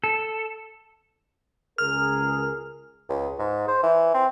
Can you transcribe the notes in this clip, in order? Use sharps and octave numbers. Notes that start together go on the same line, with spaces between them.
A4
C#2 G#4 A#4 F6
C#2
G#2
C5
E3
C4